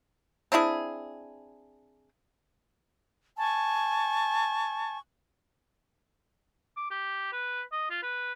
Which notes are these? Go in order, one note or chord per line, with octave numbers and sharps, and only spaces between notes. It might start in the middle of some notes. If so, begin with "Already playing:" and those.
C4 D4 E4 G#4
G#5 A5 C#6
D6
G4
B4
D#5
F4
B4